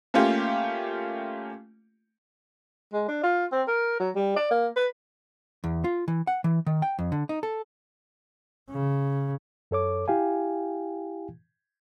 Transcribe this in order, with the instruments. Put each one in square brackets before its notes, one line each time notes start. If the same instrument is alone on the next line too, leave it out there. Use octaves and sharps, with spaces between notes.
[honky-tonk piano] A3 A#3 C#4 F4 G4
[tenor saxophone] G#3
D4
F4
C4
A#4
F#3
G3
D5
A#3
B4
[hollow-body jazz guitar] E2
F4
E3
F#5
E3
D#3
G5
F2
D3
D#4
A4
[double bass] C#3
[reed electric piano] F#2 A4 C#5 D6
E4 G4 F5 G5 G#5